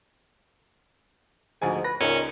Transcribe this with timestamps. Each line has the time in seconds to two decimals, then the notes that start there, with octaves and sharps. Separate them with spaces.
1.62 D2 G#2 F3 G#5
1.84 B4 A#6
2.00 C#2 A#2 C#4 D#4 A#4